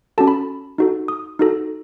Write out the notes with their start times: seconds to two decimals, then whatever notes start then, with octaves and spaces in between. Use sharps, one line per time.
0.18 C#4 F#4 A4 A5
0.28 B5
0.78 D#4 F#4 A4
1.08 D#6
1.39 D#4 F#4 A4